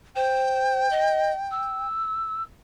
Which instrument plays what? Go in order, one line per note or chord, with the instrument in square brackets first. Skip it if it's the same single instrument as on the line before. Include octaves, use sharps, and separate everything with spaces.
[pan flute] C5 [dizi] G5
[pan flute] D#5
E6